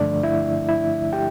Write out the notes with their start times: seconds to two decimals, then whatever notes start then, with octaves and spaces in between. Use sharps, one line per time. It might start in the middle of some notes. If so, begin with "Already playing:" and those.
Already playing: G2 D3 F3 A3 D4 D5
0.23 E4 E5
0.69 E4 E5
1.13 G4 G5